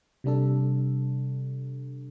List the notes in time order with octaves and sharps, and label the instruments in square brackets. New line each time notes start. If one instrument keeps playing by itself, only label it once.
[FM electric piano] C3 G3 D4 A4